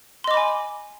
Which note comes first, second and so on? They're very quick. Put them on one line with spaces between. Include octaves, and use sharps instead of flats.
C6 D#5 D6 B5 G#5